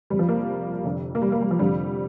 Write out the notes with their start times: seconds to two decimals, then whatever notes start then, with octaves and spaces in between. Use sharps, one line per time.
0.10 F1 F2 C3 G3
0.19 F3
0.29 A#3
0.84 F1 F2 D3
1.15 A#3
1.22 G3
1.32 A#3
1.41 G3
1.51 F3
1.59 F1 F2 D3 G3